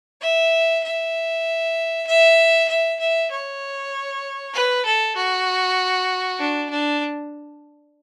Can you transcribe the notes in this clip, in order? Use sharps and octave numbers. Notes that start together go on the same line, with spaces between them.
E5
E5
E5
E5
E5
C#5
B4
A4
F#4
D4
D4